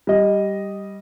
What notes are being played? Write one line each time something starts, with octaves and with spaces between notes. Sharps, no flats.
G3 D#5